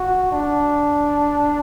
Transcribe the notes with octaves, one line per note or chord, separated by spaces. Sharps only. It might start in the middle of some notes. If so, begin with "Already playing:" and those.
Already playing: F#4
D4